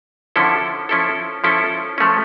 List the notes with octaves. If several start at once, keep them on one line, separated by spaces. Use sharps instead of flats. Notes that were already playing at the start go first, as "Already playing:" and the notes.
D3 F3 C#4 E4 A4
F3 C#4 E4 A4
F3 C#4 E4 A4
F3 A3 C#4